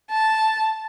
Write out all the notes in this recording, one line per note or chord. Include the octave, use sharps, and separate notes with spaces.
A5